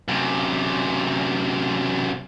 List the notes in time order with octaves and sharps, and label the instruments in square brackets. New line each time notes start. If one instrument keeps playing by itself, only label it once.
[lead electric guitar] F#2 C3